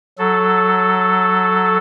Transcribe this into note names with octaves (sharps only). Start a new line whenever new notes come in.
F#3 A4